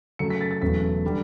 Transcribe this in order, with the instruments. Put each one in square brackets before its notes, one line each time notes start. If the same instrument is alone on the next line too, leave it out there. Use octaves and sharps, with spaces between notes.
[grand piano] F#2 C#3 F#3 A3 C#7
B6
A6
A6
E1 E2 C#3 F#3 A3 B6
D3 G3